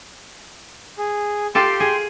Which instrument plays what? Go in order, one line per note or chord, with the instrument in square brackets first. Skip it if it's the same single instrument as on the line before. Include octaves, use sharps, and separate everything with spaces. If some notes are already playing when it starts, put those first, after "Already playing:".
[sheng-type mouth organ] G#4
[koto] F4 G4 A4 [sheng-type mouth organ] G5 C6
[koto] G#4